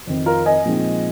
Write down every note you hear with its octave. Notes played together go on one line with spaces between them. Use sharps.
F2 D#3 C4
F4 A#4
D#5 G#5
A#2 F3 G#3 C4 D#4